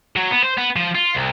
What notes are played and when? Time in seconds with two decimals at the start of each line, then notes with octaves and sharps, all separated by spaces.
0.16 F#3
0.31 B3
0.43 C5
0.58 B3
0.76 F3
0.95 F4
1.15 C2